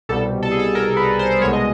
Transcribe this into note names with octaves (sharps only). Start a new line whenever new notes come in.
C2 B2 G3 A4
A4
G#4
A4
A#4
B4
C5
C2 B2 G#3 C#5
D#5